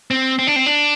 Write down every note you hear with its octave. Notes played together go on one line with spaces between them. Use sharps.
C4
C4
D4
C4
D4